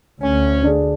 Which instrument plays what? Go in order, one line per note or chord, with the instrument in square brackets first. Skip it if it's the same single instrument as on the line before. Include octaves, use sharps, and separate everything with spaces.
[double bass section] D2 [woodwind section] C#4
[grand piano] D3 D4 G#4